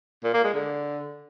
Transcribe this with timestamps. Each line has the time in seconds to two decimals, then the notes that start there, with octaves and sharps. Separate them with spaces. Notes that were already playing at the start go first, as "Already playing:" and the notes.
0.24 A#2
0.34 A#3
0.44 G#3
0.54 D3